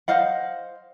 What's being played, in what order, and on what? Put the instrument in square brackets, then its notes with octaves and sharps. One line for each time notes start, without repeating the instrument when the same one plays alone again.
[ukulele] C5 D#5 F5 F#5